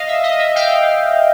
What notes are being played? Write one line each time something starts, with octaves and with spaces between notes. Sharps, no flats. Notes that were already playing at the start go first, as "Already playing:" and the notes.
Already playing: D#5 F5
E5
D#5
E5
F5 G5